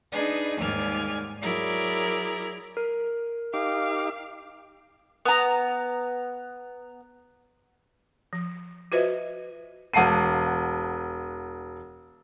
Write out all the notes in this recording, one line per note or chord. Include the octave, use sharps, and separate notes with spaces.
D4 D#4 G#4 B4
D#2 G#2 G3 D5 G#5 F6
F#3 E4 G#4 A#4 D5
A#4
D#4 G4 F5 D6
B3 A#5
F3
F4 F#4 B4 C5 D#5 E5
E1 F#5 A5 C7 D#7